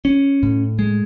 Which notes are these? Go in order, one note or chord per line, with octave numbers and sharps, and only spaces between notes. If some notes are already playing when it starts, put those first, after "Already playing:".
C#4
A2
G#3